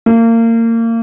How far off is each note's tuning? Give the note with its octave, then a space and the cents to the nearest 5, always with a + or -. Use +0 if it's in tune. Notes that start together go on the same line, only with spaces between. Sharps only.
A#3 -30